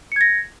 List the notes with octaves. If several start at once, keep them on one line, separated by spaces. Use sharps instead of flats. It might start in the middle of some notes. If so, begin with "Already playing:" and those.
G#6 A#6 C#7